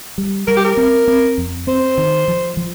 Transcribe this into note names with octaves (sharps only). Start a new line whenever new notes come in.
G3
G3 A#4
G4
A#4
C4
C4
F2
C4 C5
D#3
F3
F3